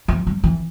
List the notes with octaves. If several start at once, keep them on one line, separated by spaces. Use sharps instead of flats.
E3
G3
E3